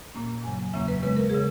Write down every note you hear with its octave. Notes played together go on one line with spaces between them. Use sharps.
A#2 A#3 C#4
F#2 C#3 F#3 G#5
E2 C#3 F#3 A#3 C#4 E5
B4
C#3 G#3 B3 B4
A#4
C#3 G#4